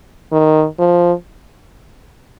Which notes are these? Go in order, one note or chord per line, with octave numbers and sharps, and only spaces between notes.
D#3
F3